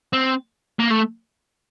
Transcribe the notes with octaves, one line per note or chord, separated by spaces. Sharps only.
C4
A#3
A3